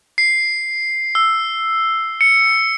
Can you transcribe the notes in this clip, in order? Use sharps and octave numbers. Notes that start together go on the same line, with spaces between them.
C7
E6
C#7